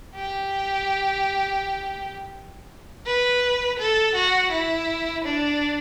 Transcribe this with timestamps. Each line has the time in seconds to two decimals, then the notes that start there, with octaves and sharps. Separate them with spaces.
0.15 G4
3.06 B4
3.79 A4
4.15 F#4
4.52 E4
5.24 D4